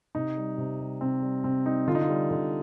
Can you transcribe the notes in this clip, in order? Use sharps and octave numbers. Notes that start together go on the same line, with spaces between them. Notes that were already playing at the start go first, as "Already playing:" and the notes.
C3 D#4
G3
C3
G3
C3 C4
G3
C3 C4
G3 D#4
D3 F4
D#4
F4
G3
D3